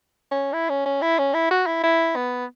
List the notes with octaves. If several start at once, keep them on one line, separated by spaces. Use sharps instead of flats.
C#4
E4
C#4
C#4
E4
C#4
E4
F#4
E4
E4
B3